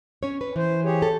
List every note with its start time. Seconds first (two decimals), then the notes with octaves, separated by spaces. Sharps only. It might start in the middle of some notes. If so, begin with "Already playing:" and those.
0.23 C#4 C#5
0.41 B4
0.56 E3 C5
0.84 G4 G#4 C#5
1.02 A4